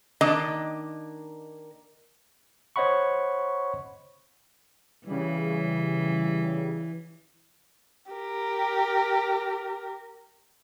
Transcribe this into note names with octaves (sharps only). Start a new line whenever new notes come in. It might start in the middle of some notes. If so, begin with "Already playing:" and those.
D#3 A#3 D4 D#5
C5 C#5 D#5 F#5 B5 C#6
C#3 E3 G3
G4 A#4